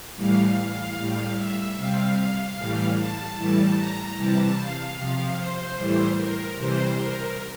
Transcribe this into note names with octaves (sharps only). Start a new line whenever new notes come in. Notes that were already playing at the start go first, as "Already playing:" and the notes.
A2 E3 G3 F5
F5
A2 G3
E5
C3 G3 F5
A2 E3 G3
A5
A2 E3 G3 A5
A#5
C3 E3 G3 A5
F5
C3 F3
C5
A2 E3 G3
A#4
C3 E3 G3 C5
A#4